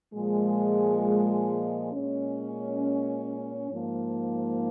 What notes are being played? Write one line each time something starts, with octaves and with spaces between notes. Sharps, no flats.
A#2 F3 G#3
A#2 G#3 C#4
G#2 F3 A#3